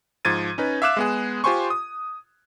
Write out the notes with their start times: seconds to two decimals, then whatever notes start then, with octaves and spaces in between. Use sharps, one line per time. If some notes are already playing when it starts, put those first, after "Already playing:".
0.25 G#2 F3 G#6 A6 D#7
0.58 C#4 D#4 B4
0.82 E5 F5 D6 F#6 E7
0.97 G#3 B3 G#4
1.44 F4 G4 C5 G#5 C6 C#6
1.70 D#6